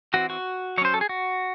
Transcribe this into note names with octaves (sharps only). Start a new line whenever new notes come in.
E3 C4 F#4
F#4
F#3 C#4 C5 C#5
A4
G#4
F#4